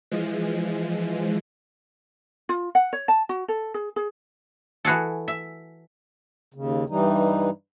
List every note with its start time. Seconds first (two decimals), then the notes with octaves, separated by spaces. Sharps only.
0.11 E3 F3 G#3
2.49 F4
2.75 F#5
2.93 C#5
3.08 A5
3.29 F#4
3.48 A4
3.74 G#4
3.96 G#4
4.85 E3 F#4 G#4 A4
5.28 E5
6.54 D#2 C#3
6.89 G2 E3 G3 D#4